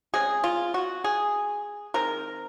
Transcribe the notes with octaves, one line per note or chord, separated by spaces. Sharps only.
C#3 G#3 C4 G#4
F4
F#4
G#4
D#3 G#3 C4 A#4